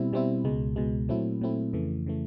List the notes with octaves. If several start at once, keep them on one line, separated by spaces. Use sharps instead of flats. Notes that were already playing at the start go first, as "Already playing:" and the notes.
Already playing: B2 G3 C4 E4
B2 G3 C4 E4
C#2 B2 G#3
C#2 B2 G#3
A#2 F#3 A3 C4 E4
A#2 F#3 A3 C4 E4
F2 C#3 E3 A3
C#3 E3 A3